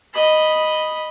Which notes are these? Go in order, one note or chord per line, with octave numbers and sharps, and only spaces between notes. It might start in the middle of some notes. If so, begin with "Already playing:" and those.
D#5 B5